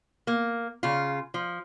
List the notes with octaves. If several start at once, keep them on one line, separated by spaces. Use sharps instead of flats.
A#3
C#3 F4
F3